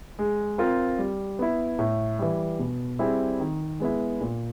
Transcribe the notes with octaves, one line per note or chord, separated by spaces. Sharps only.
G#3
C4 F4 A#4
G3
B3 E4
A2
E3 G3
B2
G3 C4 E4 G#4
D#3
G#3 B3 E4
A#2